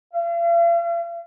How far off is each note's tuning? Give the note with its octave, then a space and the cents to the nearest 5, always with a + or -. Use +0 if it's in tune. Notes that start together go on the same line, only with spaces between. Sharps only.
F5 -45